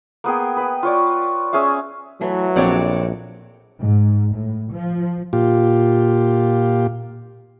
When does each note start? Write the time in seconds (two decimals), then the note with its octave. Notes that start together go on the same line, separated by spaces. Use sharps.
0.24 A#3 B3 G#4 G5
0.57 B4 G5
0.83 F4 C#5 D5
1.53 C#4 G#4 E5 F5
2.21 E3 F#3 A3
2.56 A#1 F2 C4 C#5 D5
3.80 G#2
4.33 A2
4.72 F3
5.33 A#2 F4 G4